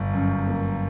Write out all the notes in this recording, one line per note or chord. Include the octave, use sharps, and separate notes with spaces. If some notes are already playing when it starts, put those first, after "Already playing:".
Already playing: G1
F#2
A#3